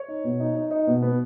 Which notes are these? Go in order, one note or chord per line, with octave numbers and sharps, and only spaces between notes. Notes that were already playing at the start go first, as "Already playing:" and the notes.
Already playing: C#5
D#4
B2
D#4
D#4
D#4
B2
B3